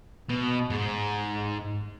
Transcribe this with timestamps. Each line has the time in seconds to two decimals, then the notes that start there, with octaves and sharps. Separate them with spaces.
0.29 B2
0.70 G#2